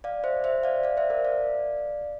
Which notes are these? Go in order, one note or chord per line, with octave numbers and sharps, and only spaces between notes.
D5 F5
C5 E5
C5 E5
D5 F5
D5 F5
C5 E5
A#4 D5
D5 F5